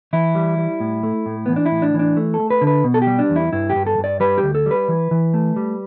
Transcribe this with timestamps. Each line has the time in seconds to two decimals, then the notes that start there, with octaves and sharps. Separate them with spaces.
0.13 E3 E4
0.35 G3
0.58 G3
0.80 A2
1.03 A3
1.26 A2
1.46 E3 B3
1.56 D4
1.66 E4
1.71 A2
1.82 D4
1.94 E3
1.99 D4
2.17 A3
2.34 A4
2.39 A3
2.50 B4
2.61 D3
2.67 B4
2.84 B2
2.94 A4
3.02 G4
3.07 G3
3.19 D4
3.30 E2
3.36 E4
3.53 G2 E4
3.70 G4
3.75 G2
3.86 A4
3.98 G2
4.04 D5
4.20 G3 B4
4.38 G4
4.43 D2
4.55 A4
4.66 G3 B4
4.88 E3
5.11 E3
5.34 A3
5.56 G3